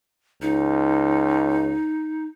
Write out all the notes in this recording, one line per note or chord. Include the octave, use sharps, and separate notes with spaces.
C#2 D#4